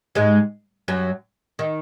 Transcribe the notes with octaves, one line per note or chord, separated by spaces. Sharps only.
G#2 G#3
F#2 F#3
D#3